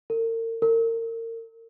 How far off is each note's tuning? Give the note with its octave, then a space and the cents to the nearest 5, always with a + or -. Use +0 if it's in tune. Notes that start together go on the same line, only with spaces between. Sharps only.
A#4 -40
A#4 -35